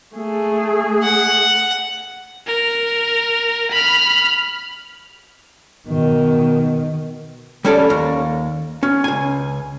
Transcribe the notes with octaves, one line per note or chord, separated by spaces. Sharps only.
A3 G#4
F#5
A#4
B5 F6
B2 D#3
G3 C#4 A4 D5
D#2
C#4
C#2 G#5